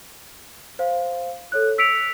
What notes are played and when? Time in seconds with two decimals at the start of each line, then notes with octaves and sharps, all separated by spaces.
0.79 C5 F5
1.52 A4 C#5 F#6
1.78 E6 B6 C#7 D7 F7